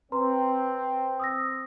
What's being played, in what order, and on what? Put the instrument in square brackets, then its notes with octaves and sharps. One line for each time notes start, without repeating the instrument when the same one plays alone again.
[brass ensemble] C4 [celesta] B4 A#5 C6
[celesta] D#6 E6 A#6